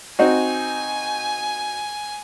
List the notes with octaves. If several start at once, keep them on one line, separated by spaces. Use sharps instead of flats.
C4 D#4 F#4 G#5